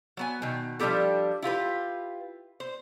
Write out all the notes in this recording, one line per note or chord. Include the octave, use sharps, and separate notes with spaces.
F#3 B3 G#5
B2 D#3
F3 G3 D4 E4 G4 A4
E4 F4 G4 B4
C5